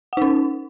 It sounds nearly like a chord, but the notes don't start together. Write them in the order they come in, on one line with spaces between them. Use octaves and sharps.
F#5 D#4 C#4